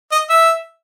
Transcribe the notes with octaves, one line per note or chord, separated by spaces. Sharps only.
D#5
E5